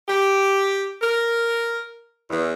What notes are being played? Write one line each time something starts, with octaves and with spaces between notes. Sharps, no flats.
G4
A#4
E2